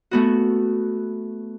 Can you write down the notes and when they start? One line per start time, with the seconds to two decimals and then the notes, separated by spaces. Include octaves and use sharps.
0.11 A3 B3 F#4